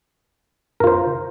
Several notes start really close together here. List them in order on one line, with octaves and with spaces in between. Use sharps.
A#4 F4 C5